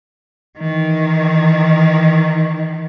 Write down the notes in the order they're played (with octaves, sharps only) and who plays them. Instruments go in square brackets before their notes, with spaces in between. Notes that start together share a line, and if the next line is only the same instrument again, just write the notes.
[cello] D#3 E3